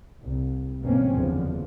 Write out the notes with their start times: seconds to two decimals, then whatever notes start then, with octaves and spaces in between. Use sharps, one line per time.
0.21 C2
0.83 G1 B2 E3 A#3 C4 C#4
1.12 F#1 E2 D3 F3